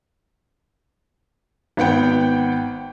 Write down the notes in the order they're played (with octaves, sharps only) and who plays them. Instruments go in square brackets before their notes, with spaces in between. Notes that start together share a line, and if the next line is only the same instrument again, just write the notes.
[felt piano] G#1 B3 F#5 G5